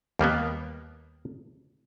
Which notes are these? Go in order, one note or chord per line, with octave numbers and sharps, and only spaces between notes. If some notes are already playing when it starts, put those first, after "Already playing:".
D#2 G3 A#3 B3